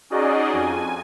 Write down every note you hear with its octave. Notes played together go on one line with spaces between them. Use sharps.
C#4 D#4 F#4 G#4 D5 D#5
F2 G#5